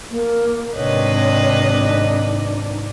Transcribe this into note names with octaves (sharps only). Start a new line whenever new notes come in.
A#3
G#1 C3 D4 B4 C#5 D#5
D#4